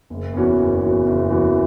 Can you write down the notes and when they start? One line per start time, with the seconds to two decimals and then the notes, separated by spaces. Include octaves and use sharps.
0.10 F#1
0.33 E2 E3 C#4 F#4
0.58 F#1
0.82 E2 E3 C#4 F#4
1.06 F#1
1.29 E2 E3 C#4 F#4